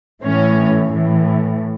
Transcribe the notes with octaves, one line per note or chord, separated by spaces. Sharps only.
A2 E3 C#4
A2 E3